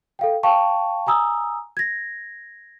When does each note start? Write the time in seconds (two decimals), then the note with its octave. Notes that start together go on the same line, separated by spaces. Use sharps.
0.19 A4 F5 G5
0.43 F5 G5 A5 C#6
1.07 G#5 A#5 D#6 E6
1.77 G#6 A#6